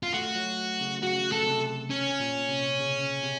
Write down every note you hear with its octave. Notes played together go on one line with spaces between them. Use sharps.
F4
A3 F#4
F#3
C#3
C#3 F#4
A4
C3
C#4
A#2
C3
C#3
C3